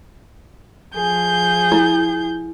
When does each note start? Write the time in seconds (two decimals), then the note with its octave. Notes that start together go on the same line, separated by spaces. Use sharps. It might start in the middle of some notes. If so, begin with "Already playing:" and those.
0.94 F3 G#4 G6
1.72 E4